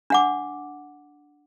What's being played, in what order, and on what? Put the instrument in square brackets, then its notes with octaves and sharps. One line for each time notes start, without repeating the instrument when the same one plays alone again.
[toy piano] D4 F#5 D6